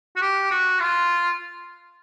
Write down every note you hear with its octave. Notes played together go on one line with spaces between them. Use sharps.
F#4
G4
F#4
F4